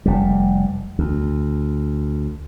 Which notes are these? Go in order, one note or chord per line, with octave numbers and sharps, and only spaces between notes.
F1 G3
D2